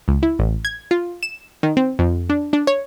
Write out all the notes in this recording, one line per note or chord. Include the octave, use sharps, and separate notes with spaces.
C#2
E4
A1
G#6
F4
E7
D#3
C4
F2
D4
D4
C#5